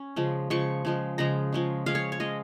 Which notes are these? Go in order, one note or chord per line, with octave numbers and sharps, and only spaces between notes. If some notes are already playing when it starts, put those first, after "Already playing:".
Already playing: C#4
C#3 F3 G#3
C#3 F3 G#3 C#6
C#3 F3 G#3
C#3 F3 G#3 A#5
F3 G#3 C#4
F3 G#3 C#4 F5
C#5
C#5
F3 G#3 C#4 D#5